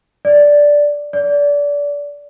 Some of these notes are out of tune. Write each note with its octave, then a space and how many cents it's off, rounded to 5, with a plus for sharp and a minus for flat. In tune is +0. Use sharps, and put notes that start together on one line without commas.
D5 -5
D5 -25